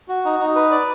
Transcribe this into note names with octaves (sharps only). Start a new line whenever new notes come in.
F#4
D#4
D#4
B4
D5